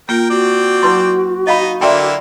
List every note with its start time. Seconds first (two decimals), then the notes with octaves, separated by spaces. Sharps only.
0.09 A#3 F4 A#4 G5
0.30 C4 F#4 D5 G5
0.83 F#3 E4 B4 C6
1.47 D#4 D#5 F5 B5
1.81 D3 A#3 E4 D5 E5 G5 C6